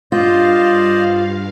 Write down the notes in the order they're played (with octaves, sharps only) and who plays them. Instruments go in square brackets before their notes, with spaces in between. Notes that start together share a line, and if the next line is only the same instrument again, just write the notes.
[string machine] G2 F5 [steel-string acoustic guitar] F4 [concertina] C5 D5 D#5